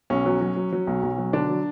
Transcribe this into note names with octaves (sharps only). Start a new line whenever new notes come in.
B1 C#4
F#3
F#3
F#3
F#3
B1
B1
F#3
D3 D4
F#3